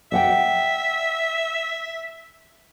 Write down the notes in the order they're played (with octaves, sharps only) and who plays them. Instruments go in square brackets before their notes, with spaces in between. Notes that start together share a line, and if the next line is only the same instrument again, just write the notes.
[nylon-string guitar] D5 F#5 G5 [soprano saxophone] E5